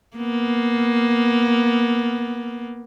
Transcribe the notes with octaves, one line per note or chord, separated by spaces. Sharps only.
A#3 B3